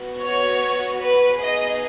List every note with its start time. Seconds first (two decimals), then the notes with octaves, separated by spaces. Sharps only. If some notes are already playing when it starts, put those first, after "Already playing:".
Already playing: B3 F#4
0.25 C#5
1.03 B4
1.42 B3 D#4 G#4 D#5